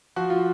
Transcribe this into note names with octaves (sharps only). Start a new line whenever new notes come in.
F3 F#4
F4